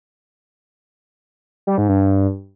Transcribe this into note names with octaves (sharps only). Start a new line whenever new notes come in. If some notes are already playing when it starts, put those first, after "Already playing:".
G3
G#2
G2